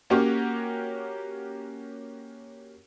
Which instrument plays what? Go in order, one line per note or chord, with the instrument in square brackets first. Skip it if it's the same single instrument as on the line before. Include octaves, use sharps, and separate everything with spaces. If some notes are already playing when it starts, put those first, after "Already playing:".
[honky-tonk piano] A#3 C#4 F#4 G4 A#4 C#5